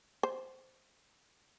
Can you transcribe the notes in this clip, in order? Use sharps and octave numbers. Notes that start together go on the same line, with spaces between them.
C5